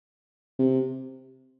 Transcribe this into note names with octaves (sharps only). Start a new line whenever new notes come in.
C3